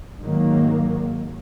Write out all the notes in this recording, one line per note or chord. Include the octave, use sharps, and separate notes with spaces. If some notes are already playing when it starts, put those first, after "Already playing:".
G#2 D#3 F#3 A#3